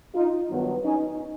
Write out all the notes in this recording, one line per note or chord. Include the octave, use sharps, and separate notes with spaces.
D#4 F4
G2 D#3 F#3 B3
C#4 D#4